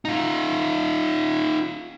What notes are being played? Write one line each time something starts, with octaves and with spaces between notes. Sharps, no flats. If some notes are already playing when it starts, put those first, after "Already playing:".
D#4 F4